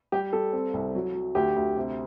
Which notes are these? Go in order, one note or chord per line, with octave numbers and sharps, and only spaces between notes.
G3 G4
G3 A4
C4
C2
F#3
F#3
D2 G4
D2
C3